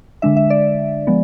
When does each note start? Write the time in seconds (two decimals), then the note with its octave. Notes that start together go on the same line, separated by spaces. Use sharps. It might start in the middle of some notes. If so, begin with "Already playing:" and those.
0.22 D3 G#3 D4 E5
0.37 E5
0.50 D5
1.07 F3 G#3 B3